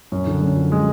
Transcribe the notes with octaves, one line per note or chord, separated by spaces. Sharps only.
F#2
D3
F#2
F3
G#3